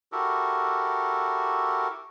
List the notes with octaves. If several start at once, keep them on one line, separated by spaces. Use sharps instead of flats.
E4 F#4 G4 A4 A#4